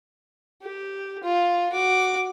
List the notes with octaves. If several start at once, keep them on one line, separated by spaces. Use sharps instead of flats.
G4
F4
F#4 D6